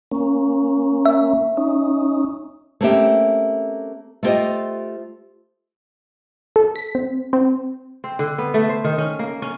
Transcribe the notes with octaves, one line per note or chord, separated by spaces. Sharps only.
A#3 C#4
E5
C#4 D#4
A3 A#3 C4 C#4 G4 E5
A3 E4 F4 G4 C5 D#5
A4
B6
C4
C4
C4
D3
B3
A3
C5
D#3
C#4
A#3
C#4